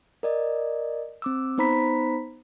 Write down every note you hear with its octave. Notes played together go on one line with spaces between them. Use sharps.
A#4 D5 D#5
C4 D6 E6
B3 D#4 C5 A#5 B5 B6